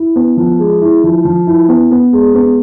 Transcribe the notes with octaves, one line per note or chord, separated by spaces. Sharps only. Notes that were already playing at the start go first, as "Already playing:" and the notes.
Already playing: E4
B3
F3
G#3
E4
F3
F3
E4
B3
B3
G#3
B3